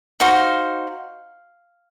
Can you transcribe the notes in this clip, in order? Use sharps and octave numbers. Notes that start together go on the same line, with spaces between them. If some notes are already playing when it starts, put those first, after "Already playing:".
D#4 F#4 C5 F5